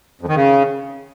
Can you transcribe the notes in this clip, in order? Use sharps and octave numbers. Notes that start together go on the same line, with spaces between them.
F2
D#3
C#3